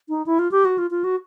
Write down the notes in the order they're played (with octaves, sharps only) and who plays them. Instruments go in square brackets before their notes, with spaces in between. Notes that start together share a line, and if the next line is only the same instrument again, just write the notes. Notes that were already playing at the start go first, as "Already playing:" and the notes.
[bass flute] D#4
E4
F4
G4
F#4
F4
F4
F#4